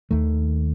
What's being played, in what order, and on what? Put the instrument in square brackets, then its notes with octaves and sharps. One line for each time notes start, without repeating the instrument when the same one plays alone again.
[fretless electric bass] D#2 D#3 A3